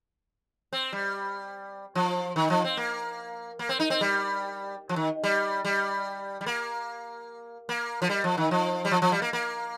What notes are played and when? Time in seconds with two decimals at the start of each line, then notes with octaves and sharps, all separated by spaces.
0.73 C4
0.93 G3
1.95 F3
2.36 D#3
2.50 F3
2.64 C4
2.77 A#3
3.59 A#3
3.69 C4
3.80 D#4
3.90 C4
4.01 G3
4.89 F3
4.96 D#3
5.24 G3
5.65 G3
6.41 G3
6.46 A#3
7.69 A#3
8.02 F3
8.10 G3
8.24 F3
8.37 D#3
8.51 F3
8.85 G3
8.91 F3
9.02 F3
9.12 G3
9.22 A#3
9.33 A#3